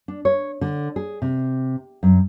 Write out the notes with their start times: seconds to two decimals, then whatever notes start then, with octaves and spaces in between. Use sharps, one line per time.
0.08 D4
0.25 C#5
0.61 D3
0.96 G#4
1.22 C3
2.03 F#2